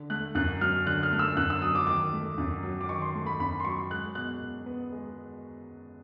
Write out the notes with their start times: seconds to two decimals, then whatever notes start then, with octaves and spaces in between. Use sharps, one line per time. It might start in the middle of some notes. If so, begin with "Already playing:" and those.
Already playing: D3
0.10 A3 F#6
0.35 F#2 F#6
0.61 F#3 F6
0.86 D3 F#6
1.03 F6
1.12 A3
1.19 E6
1.37 F#2 F#6
1.50 E6
1.62 F#3 D#6
1.75 D6
1.87 D#3 D6
2.13 A3
2.38 F#2
2.63 F#3
2.81 D6
2.89 D#3 C#6
3.02 C6
3.15 A3
3.26 B5
3.40 F#2 B5
3.60 C6
3.65 F#3 C#6
3.90 G#3 F#6
4.15 B2 F#6
4.40 B2
4.66 B3
4.92 G#3